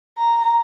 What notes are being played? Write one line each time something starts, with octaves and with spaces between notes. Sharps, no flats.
A#5